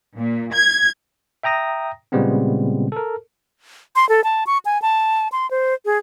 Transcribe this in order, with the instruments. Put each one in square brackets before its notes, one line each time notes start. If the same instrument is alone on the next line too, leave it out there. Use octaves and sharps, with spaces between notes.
[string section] A#2
G#6
[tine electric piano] E5 G5 A#5 D#6 A#6
A#2 C#3 G3 G#3 B3 C4
A4 A#4
[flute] C6
A4
A5
C#6
G#5
A5
C6
C5
G#4